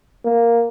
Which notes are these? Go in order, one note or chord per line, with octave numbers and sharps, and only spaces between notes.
A#3